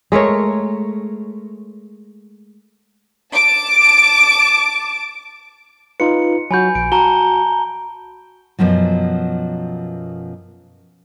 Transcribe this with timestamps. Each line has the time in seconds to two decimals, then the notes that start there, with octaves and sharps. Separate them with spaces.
0.12 G#3 A3 A#4 C#5
3.34 A5 D6
6.00 D#4 F4 B4 C#7
6.51 F#3 F#4 G#5 B5 G6
6.75 A#1 D7
6.92 F#4 A5 A#5 G7
8.59 F#2 B2 F3 F#3